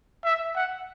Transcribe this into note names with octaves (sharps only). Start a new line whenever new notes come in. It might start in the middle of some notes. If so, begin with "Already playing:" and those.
E5
F#5